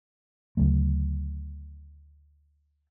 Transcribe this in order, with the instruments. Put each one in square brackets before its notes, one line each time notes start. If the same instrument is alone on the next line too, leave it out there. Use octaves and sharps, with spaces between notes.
[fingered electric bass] D2 C#3 F#3 A3